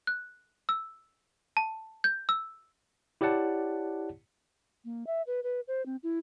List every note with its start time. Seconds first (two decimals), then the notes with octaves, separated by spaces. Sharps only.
0.07 F#6
0.69 E6
1.57 A5
2.04 G6
2.29 E6
3.21 E4 G4 C#5 D5 F#5 A5
4.85 A#3
5.07 E5
5.27 B4
5.43 B4
5.68 C5
5.86 C4
6.03 E4